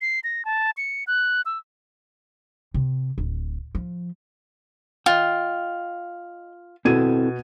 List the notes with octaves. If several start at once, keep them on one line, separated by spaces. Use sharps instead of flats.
C7
A#6
A5
C#7
F#6
E6
C3
D1
F3
F4 D#5 G5
B2 C4 E4 A4 G#6 D#7